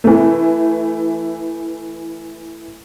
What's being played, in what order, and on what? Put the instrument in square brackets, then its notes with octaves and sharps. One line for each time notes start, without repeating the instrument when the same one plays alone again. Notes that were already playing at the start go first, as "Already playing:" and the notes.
[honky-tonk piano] E3 A3